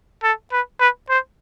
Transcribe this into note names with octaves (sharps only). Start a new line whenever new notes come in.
A4
B4
B4
C5